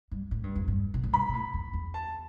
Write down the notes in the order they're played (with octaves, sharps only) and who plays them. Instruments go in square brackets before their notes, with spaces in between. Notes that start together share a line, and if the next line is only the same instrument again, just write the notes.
[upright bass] G2
A2
G2
F2
G2
B2
A2
[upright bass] G2 [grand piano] B5
[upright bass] B2
A2
F2
E2
[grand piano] A5